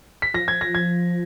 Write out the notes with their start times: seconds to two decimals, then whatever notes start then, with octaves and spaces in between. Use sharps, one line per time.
0.22 B6
0.34 F3 A#6
0.48 G#6
0.61 A#6
0.75 G#6